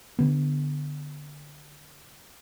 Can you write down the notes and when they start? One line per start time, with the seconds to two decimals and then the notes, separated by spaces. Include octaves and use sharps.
0.19 D3 B3